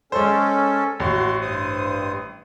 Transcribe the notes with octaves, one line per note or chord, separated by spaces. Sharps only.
G#3 C#4 A4 C5
A1 F#4 C6
G2 C5 D#6